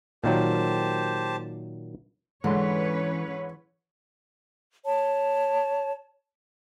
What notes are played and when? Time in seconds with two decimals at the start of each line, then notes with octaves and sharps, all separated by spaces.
0.24 A#2 D#3 F#3 G4 C5 A5
2.44 G#2 D3 E3 C#4 B4 C#5 C6
4.84 C#5 A5